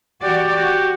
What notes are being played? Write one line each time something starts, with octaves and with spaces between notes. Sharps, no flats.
E3 F#4 G4 D5
F#4 G4